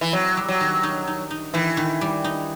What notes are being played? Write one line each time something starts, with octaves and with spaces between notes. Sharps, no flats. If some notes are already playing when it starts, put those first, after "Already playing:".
E3
F#3 C4
G3
F#3
D#3
D#4
D#4
D#4
D#3 E3
D#3
G3
D#4